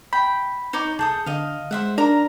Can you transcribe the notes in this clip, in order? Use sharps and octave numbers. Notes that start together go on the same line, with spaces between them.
G5 B5
D#4 C#5 D6
C2 G#4 A4 A5 D#6 G6
D3 D#5 F5
G#3 C5 E5 F#5
D4 A#4 A#5